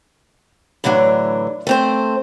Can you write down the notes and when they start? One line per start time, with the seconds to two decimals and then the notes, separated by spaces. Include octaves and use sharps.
0.84 A2 D3 E3 F#3 D4
1.67 A3 C4 C5